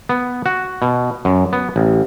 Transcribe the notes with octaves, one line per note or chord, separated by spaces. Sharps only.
B3
F#4
B2
F#2
B3
A1